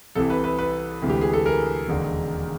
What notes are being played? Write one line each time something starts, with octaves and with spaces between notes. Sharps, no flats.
C2 C3 E3 A4
B4
B4
B4
D2 C3 E3 G#3
G4
G#4
A4
A#4
E1 D#2 D3